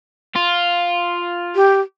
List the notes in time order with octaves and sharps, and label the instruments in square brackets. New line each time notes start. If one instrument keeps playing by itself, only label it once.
[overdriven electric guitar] F4
[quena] G4